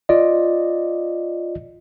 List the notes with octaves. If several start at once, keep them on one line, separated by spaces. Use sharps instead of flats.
F4 D5 D#5